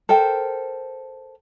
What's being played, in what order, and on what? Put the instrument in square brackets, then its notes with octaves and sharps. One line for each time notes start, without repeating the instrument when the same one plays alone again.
[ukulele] A4 A#4 C5 G5